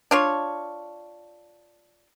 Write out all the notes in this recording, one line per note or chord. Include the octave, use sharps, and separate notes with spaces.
D4 F4 C#5